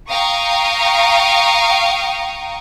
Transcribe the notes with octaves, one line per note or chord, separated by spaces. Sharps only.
F5 G5 A#5 C#6 D#6